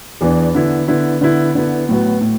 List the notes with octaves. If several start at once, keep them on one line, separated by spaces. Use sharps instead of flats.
E2 E3 B3 D4
D3 B3 E4
D3 B3 E4
D3 B3 E4
D3 B3 E4
A2 F#3 B3
A2